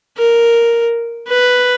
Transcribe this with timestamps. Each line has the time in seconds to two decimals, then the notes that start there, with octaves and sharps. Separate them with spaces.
0.18 A#4
1.28 B4